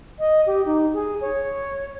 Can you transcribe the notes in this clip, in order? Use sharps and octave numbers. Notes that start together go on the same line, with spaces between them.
D#5
G4
D#4
G#4
C#5